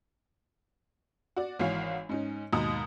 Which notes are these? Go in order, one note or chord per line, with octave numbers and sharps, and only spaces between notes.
F#4 D5
G#1 E3 F#4 C#5 F5
G#2 C#4 D#4
D#2 G#2 B2 A#5 D#6